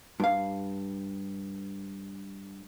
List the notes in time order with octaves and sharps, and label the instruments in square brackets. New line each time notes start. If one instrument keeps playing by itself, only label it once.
[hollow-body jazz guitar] G2 F5